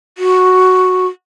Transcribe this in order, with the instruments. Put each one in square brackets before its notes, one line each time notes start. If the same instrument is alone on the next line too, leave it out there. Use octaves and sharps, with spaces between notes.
[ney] F#4